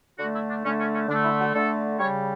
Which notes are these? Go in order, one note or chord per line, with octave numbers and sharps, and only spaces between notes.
D3 A3 F#4
E4
D4
D3 A3 C#4
C#4
C#4
D3 A3 D4
E4
F#4
D3 A3 A4
C#3 G3 C#5